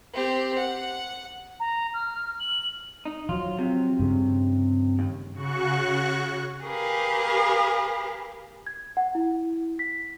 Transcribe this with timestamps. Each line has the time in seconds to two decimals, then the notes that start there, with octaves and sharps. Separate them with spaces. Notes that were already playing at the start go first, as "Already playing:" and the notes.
0.14 C4 G4
0.58 F#5
1.60 A#5
1.94 F6
2.40 F#7
3.05 D#4
3.29 F3 F#3 F4
3.59 C3
3.99 G2 C#3
4.99 D#2
5.33 C#3 F#4 C#6 F#6
6.64 G4 G#4 A#4 B4 F5
8.67 G#6
8.97 F#5
9.15 E4
9.79 B6